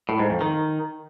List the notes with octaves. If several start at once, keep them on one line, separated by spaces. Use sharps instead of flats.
A2
G#2
F2
D#3